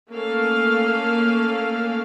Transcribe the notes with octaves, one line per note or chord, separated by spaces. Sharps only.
A3 A#3 C#4 A4 F5